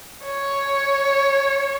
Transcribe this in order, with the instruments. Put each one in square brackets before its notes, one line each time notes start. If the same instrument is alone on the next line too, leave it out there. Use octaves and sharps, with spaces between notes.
[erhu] C#5